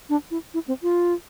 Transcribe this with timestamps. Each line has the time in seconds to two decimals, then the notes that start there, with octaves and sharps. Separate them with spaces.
0.10 D4
0.31 E4
0.54 E4
0.68 C4
0.83 F4